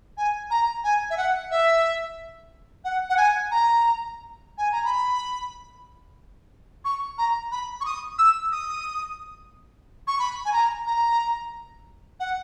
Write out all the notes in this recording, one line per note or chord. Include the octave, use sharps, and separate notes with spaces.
G#5
A#5
G#5
E5
F#5
E5
F#5
F#5
G#5
A#5
G#5
A#5
B5
C#6
A#5
B5
C#6
D#6
E6
D#6
C#6
B5
G#5
A#5
A#5
F#5